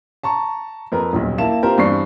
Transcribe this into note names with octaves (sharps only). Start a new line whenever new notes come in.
A5 A#5 C#6
F2 A#4 B4
D#1 B1
A#3 E4 A5 E7
C4 F4 G4 A#4 C5
E2 G2 C4 D5 C#6 C7